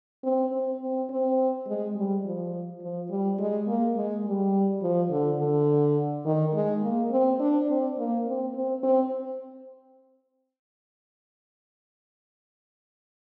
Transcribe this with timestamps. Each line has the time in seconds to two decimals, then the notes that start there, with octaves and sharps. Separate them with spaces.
0.24 C4
0.52 C4
0.81 C4
1.10 C4
1.67 G#3
1.96 G3
2.25 F3
2.82 F3
3.10 G3
3.39 G#3
3.68 A#3
3.97 G#3
4.25 G3
4.82 F3
5.11 D3
5.39 D3
6.26 D#3
6.54 G#3
6.83 A#3
7.11 C4
7.40 D4
7.69 C4
7.98 A#3
8.26 C4
8.55 C4
8.83 C4